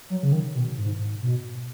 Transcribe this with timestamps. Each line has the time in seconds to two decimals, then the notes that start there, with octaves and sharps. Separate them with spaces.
0.10 F#3
0.23 C#3
0.32 D#3
0.55 B2
0.77 G#2
1.22 B2